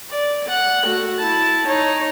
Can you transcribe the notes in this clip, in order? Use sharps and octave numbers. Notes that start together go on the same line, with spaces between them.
D5
F#5
A3 F#4
E4 A5
D#4 C#5